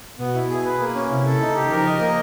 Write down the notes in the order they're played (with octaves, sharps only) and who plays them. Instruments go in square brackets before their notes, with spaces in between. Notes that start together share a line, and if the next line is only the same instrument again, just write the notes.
[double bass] B2 [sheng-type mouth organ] B3
[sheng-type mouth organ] E4
G#4
B4
A#3
C#4
[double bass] C3 [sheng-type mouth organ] E4
[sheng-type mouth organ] A4
[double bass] C#3 [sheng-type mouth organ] D#4
[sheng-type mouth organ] G4
[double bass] F3 [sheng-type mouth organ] A#4
[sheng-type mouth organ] D#5
A#3